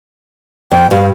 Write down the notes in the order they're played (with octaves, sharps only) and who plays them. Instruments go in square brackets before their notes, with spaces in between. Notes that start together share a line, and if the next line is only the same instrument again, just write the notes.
[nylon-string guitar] F2 [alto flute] G5
[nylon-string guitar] G2 [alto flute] F5